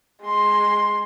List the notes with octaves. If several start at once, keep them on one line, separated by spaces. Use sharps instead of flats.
G#3 C6